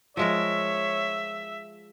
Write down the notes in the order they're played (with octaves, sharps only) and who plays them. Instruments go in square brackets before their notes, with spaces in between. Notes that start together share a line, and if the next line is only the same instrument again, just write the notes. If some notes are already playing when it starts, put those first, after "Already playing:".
[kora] F3 G#3 A#4 [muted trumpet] C#5 [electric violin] E5